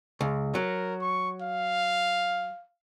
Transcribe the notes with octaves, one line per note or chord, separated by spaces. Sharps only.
C#2
F#3 A#4
C#6
F5